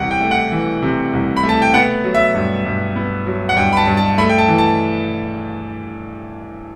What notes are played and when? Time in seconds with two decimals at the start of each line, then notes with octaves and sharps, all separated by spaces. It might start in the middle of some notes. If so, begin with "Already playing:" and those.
Already playing: C2 C3 E3 F#5 G5
0.11 G5
0.21 A3
0.31 F#5
0.52 E3
0.82 C3
1.13 C2
1.36 B5
1.43 A3
1.49 A5
1.62 G5
1.74 B3 F#5
2.04 F#3
2.14 E5
2.35 G2
2.65 G2
2.96 B3
3.27 F#3
3.49 F#5
3.56 G2 G5
3.72 B5
3.77 A5
3.87 G2
3.97 A5
4.18 A3 B5
4.29 G5
4.38 A5
4.48 E3
4.58 A5